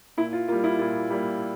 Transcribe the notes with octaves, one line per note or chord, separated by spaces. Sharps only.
A#2 E4
F4
G3 A#3 F4
E4
A#2 F4
G3 A#3